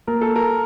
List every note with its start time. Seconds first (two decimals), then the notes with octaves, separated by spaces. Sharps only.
0.07 A#3 A#4
0.21 A4
0.36 A#4